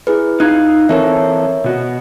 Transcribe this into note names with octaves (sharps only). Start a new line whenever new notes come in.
E4 G#4 B4
D#4 F4 F#6 G#6
E3 C4 A4 A#4 C#5 E5
B2 F#4 D#5